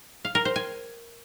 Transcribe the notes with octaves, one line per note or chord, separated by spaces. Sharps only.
F5
A#4
C5
G#5